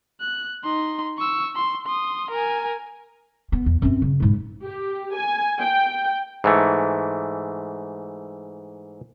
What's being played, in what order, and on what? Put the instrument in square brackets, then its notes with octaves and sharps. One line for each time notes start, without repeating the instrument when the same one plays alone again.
[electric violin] F#6
D#4 C6
C#6 E6
C6
C6 D#6
A#4 G#5
[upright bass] B3
E2
F#2 C4
C#3
G#2 E4
[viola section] G4
G#5
G5
[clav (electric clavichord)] G#2 E3 A3